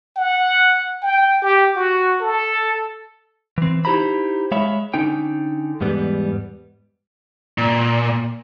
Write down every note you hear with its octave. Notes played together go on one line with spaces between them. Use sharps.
F#5
G5
G4
F#4
A4
E3 C4
D#4 E4 G4 C5 A#5 B5
G#3 C#5 E5 F5 B5
D3 C#4 D#4 G5
E2 G#2 G3 B3
A#2